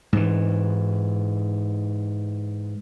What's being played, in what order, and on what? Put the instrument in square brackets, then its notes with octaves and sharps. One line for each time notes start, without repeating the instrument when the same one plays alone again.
[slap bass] G#2 E3